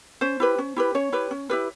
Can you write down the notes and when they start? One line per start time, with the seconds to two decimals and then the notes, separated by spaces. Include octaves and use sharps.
0.21 C#4 C5
0.40 E4 G4 B4
0.58 C#4
0.76 E4 G4 B4
0.95 C#4 C#5
1.12 E4 G4 B4
1.31 C#4
1.50 E4 G4 B4